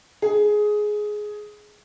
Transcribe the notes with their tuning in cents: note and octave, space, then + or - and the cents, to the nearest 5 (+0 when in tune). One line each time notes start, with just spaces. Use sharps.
G#4 +10